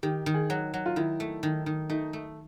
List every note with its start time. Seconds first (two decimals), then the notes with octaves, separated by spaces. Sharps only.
0.03 D#3 G4
0.26 D#3
0.34 G#4
0.50 F#3
0.74 F#3
0.86 F4
0.96 D#3 E4
1.20 A3
1.43 D#3
1.66 D#3
1.90 A3 D#4
2.13 A3